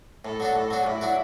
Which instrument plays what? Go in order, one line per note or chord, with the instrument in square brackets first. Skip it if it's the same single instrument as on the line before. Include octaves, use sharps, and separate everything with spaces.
[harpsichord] A2 [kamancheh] A4
[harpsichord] F#3 D4 F#4
A2
F#3 D4 F#4
[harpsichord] A2 [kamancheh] E4
[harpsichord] F#3 D4 F#4